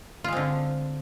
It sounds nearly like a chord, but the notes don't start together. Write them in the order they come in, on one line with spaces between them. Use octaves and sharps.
F4 G#3 C4 D3